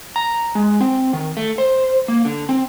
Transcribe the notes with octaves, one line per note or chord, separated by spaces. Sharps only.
A#5
G#3
C4
D#3
A3
C5
A#3
D3
C4